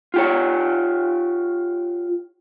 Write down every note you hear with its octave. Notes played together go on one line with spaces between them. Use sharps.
F4 G4 C#5